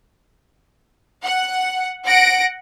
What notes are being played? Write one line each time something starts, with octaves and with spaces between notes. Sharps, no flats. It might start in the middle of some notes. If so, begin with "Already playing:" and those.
F#5
F#5 A#6 D7